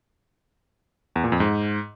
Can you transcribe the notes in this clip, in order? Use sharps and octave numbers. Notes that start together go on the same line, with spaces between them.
E2
A#2
F2
G#2